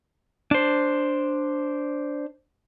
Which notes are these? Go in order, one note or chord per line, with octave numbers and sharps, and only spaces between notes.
D4 C5